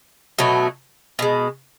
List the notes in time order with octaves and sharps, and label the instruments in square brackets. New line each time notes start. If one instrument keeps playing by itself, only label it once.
[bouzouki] B2 F#3 A3
B2 G#3